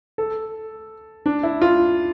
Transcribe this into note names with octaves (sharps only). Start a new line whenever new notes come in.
A4
D4
E4
F4